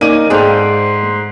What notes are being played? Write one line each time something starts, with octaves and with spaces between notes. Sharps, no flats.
A#3 C#4 D#4 A#4 D5 D#7
G#2 G#4 A4 C5 D5 F5 G5
C6